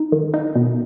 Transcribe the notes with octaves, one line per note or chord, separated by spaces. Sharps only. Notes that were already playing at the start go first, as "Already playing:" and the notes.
Already playing: D#4
D#3
D#4
B2